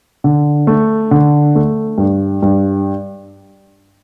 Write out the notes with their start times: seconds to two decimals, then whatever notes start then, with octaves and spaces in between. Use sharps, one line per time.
0.24 D3
0.67 A3
1.11 D3
1.55 A3
1.98 G2
2.43 G2